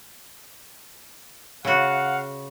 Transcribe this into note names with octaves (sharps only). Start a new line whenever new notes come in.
C#3 F#4 F5 F#5